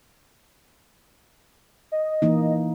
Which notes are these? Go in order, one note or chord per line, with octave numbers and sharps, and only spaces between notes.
D#5
E3 A#3 D#4